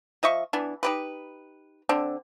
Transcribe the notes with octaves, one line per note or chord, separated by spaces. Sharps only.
F3 D#5 E5 C#6
E3 B3 D4
D#4 G4 B4
D3 C4 D4